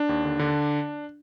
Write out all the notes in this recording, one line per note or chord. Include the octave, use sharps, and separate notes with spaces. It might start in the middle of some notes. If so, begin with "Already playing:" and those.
Already playing: D4
D#2
D3
D3